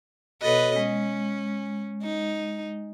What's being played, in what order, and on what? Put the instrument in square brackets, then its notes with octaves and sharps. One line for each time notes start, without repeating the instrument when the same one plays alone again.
[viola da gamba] B2 B4 D#5 [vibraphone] F#4 A4 C#5
[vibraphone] G#3 [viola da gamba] C#4
[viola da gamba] D#4